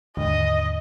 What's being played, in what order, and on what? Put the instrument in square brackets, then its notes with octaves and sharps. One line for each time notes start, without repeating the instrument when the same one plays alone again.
[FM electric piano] D#2 G#2 D3 [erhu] D#5